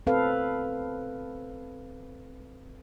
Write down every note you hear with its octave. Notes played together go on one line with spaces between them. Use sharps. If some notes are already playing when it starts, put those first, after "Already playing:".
C4 A4 B4 F5